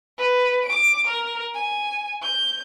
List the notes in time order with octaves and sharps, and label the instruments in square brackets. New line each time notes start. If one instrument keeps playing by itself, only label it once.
[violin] B4
D6 D7
A#4
G#5
G6